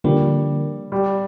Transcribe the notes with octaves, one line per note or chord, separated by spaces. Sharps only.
D3 F3 G3 A#3
G3